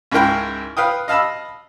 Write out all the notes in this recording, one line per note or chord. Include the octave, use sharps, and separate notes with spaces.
C#2 G#2 E4 A#4 G5
B4 F5 G5 D#6
D#5 F5 A5 B5 E6